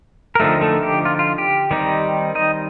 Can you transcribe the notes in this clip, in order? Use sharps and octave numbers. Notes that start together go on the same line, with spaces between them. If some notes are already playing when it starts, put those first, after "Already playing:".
A#4
D3 F3 A3 C4 D#4 A4
A3 A4
G4
F4
F4
G4
D#3 G3 C4 D#4
D#4 D#5